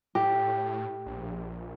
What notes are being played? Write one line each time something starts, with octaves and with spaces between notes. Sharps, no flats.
A2 G4
A#1